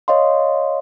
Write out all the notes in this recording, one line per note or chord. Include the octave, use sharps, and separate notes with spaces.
C#5 D#5 F5 C6